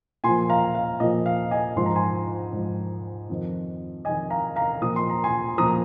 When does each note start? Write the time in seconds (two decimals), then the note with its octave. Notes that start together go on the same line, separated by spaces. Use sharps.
0.24 A#2 G#5 C6
0.29 F3
0.50 F5 A#5
0.75 F5
1.00 A#2 F3 D#5
1.26 F5
1.51 D#5 G#5
1.76 G#2 F3 C6
1.86 A#5
1.96 G#5 C6
2.52 G#2 F3
3.29 F2 D#3
4.05 F2 D#3 D#5 G#5
4.30 F5 A#5
4.56 F5 A#5
4.81 A#2 F3 D#6
4.96 C6
5.10 A#5
5.24 G#5 C6
5.58 A#2 F3 A#5 D#6